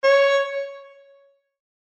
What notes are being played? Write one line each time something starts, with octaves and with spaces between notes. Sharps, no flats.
C#5